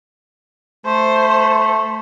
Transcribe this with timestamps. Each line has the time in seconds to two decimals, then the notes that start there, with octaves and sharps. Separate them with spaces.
0.86 A3 C5